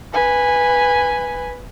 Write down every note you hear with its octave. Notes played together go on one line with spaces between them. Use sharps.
B4 G#5